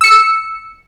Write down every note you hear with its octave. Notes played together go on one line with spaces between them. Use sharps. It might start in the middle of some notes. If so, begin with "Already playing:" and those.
E6 C#7